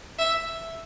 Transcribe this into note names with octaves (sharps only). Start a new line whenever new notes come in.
E5